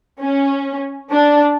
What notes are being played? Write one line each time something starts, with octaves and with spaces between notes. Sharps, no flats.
C#4
D4